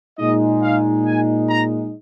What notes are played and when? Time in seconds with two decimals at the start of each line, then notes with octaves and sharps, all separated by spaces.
0.18 A#2 G#3 D#4 D#5
0.62 F5
1.06 G#5
1.49 A#5